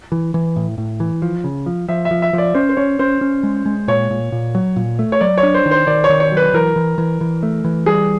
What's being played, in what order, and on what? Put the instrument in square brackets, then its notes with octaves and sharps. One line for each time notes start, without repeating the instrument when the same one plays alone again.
[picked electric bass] E3
E3
A2
A2
E3
F3
C#3
F3
[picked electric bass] F3 [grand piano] E5
[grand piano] E5
[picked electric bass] F3
[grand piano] E5
[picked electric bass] F3 [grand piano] D5
[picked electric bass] C#4 [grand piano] C5
[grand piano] C5
[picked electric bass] C#4 [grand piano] C#5
[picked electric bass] C#4 [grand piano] C5
[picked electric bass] C#4
G#3
G#3
[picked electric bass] A#2 [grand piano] C#5
[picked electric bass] A#2
A#2
F#3
A#2
A3
[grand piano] C#5
[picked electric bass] F#3 [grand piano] D5
[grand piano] C#5
[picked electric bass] D4
[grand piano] C5
[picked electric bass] D#3
[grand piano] C5
[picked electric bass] D#3 [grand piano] D5
[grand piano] C#5
[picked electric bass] D#3
[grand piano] C#5
[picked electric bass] F#3
[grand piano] B4
[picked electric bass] E3 [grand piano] A#4
[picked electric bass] E3
E3
E3
A3
E3
[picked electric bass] G3 [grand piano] G#4